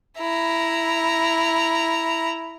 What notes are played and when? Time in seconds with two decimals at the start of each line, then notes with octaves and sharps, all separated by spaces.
0.19 E4 A#5